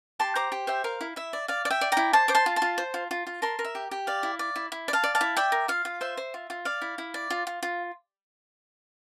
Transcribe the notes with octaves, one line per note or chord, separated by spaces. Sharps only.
G4 A5 C6
C5 A#5 D6
G4
C5 E5 G5
A#4 F5
E4
E4 E5
D5
D5 F5
D5
E5 G5
D5
E4 G5 A#5
C5 A5 C6
C5 D6
A5 C6
F4
A5 C6
F4
C5
F4
F4
F4
A#4 A5 C6
A#4
E5
G4
G4
D5 F5
E4
D5
E4
E4
D5
F5 A5
D5
F5 A5
E4
D5 E5 G5
A#4
F4 F5
F4
C5 E5
C5
F4
F4
D5 F5
E4
E4
D5
F4
F4
F4